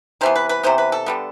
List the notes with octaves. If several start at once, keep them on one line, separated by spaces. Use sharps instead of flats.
C3 E3 B3 C5
B4
B4
C3 E3 B3 C5
B4
A4
D3 G3 B3